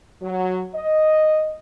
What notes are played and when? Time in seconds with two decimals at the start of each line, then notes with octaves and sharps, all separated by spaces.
0.22 F#3
0.75 D#5